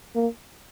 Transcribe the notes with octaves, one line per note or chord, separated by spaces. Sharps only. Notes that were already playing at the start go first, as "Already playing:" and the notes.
A#3